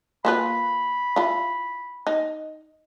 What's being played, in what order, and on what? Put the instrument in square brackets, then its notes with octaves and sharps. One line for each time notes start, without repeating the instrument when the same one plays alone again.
[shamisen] A#3 F4 B4 [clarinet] B5
[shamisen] E4 F4
D#4